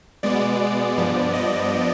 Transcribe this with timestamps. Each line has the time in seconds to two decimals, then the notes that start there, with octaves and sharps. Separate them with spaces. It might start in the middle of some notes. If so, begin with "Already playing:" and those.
0.23 B2 G#3 B3 D5
0.98 G2 F3 B3
1.34 D#5